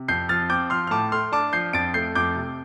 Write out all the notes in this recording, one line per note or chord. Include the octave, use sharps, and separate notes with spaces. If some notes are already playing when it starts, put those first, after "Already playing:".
Already playing: C3
F2 G6 C7
F3 F6 A6
C4 D6 G6
F3 C6 F6
F6
A2 A5 D6
A3 C6 F6
D4 A5 D6
F3 G6 C7
F2 A6 D7
A3 G6 C7
F2 D6 G6
C3